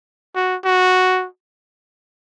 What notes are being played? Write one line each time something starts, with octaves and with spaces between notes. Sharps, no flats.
F#4
F#4